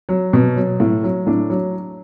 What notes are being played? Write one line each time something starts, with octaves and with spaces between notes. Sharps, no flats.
F#3
B2
F#3
A2
F#3
A2 D4
F#3